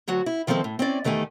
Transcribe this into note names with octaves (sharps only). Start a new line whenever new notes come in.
D2 F#3 F#4
E4
D#3 F3 G#3 C4 A4
A2
C4 C#4 E4 D5
E2 D#3 A3 G4 G#5